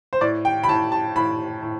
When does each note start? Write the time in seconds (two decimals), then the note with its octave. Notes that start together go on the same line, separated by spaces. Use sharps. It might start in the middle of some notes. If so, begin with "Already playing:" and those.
0.13 C5
0.21 A2 D5
0.45 G5
0.64 B5
0.68 A2 A5
0.92 A5
1.16 A2 B5
1.62 A2